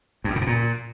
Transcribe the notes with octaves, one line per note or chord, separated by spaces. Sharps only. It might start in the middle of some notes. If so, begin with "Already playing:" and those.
G2
F#2
C#3
B2
A#2